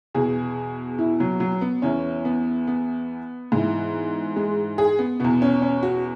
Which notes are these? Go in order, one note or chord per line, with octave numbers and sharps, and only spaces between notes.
E2 B2 G#4
E4
F#3
F#3
B3
E2 E3 C#4
B3
B3
G#2 E3
G#3
G#4
B3
E2 B2 B3
C#4
C#4
F#4